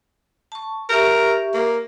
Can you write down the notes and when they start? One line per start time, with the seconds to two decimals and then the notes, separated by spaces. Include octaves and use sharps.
0.52 A5 C#6
0.90 G4 A#4 E5 C#6
1.54 A#3